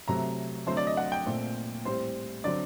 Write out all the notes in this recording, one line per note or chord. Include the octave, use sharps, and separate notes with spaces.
C3 F#3 A3 C4 A#5
D3 F#3 A3 C4 C5
D5
D#5
F#5
G5
A#2 A3 C4
A2 G3 C4 C5
D3 F#3 C4 D5